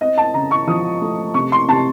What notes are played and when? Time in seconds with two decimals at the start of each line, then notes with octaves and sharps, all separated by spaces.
0.01 C4 D#5
0.18 A5
0.34 C#3 A#5
0.51 C#6
0.67 F3 D#6
1.01 A3
1.34 C3 C#6
1.52 C6
1.68 C3 A5